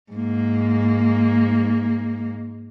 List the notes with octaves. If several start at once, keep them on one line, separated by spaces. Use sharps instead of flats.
G#2 A#3